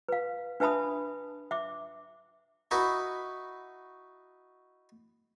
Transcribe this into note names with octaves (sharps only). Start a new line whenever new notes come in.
B4 F5
D4 B4 E5 A5 B5 D#6
E5 D6
D#4 E4 F#4 B4